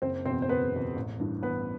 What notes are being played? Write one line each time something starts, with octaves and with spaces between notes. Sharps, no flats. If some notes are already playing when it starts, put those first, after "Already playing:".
F#1 C4 C5
E2 B2 C4 C5
C5
F#1 B3 B4
E2 B2
A1
G2 E3
A1 B3 B4